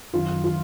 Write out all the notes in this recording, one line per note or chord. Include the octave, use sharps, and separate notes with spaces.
F#2 D#3 F4
F4